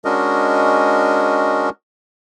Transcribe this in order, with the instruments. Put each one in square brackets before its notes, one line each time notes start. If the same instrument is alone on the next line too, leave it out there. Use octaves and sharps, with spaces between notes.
[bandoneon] G#3 C#4 D4 F#4 A#4 D#5